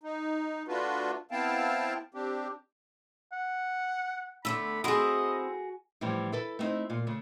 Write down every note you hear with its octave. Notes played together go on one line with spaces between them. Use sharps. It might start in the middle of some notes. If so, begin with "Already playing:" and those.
D#4
A3 D4 F4 F#4 B4
B3 C4 E4 F5 G5 A5
C4 D4 G4
F#5
D3 A3 B3 B5 E6
C4 E4 F#4 G#4 D#5 C6
A2 E3 F3 G3 C#4
E4 A4 B4
A3 B3 C4 D#4 E4
A#2 F4
C#3 A3